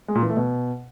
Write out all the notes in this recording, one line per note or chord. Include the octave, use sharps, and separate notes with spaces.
G#3
A#2
E3
A3
B2